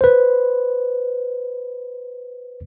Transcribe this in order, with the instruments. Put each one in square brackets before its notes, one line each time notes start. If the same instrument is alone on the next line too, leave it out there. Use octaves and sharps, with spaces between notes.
[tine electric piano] B4 C5